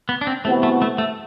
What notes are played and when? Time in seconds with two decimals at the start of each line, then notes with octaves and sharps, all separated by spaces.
0.09 B3
0.21 D4
0.27 C4
0.45 C3 E3 A3 B3 F#4
0.63 A3
0.82 A3
0.98 A3